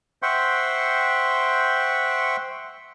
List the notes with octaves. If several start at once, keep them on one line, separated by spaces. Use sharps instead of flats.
C5 E5 F#5 G5 C6 C#6